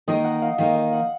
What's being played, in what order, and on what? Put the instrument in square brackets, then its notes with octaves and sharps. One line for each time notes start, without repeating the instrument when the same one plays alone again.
[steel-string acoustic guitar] D#3 A#3 D#4 A#4 [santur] D#5
[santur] F#5
F5
[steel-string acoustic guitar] D#3 A#3 D#4 A#4 [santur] D#5
[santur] F5
F#5